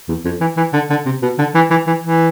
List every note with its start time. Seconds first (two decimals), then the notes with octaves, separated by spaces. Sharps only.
0.08 E2
0.24 F2
0.41 E3
0.57 E3
0.73 D3
0.90 D3
1.06 C3
1.22 B2
1.38 D3
1.55 E3
1.70 E3
1.87 E3
2.03 E3